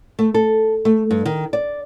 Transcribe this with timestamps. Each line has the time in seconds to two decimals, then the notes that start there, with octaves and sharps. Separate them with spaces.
0.19 A3
0.34 A4
0.85 A3
1.11 G2
1.26 D#3
1.53 D5